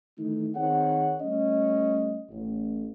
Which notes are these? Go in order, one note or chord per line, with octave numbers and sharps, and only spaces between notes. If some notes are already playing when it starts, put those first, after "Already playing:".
D#3 E3 A3 D#4
D#3 C4 G#4 C#5 F#5
G3 A3 C#4 D#5
A1